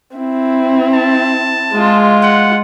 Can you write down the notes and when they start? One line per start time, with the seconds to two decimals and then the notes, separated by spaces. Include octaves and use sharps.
0.17 C4 E4
0.94 A5
1.72 G#3 F4
2.23 F#5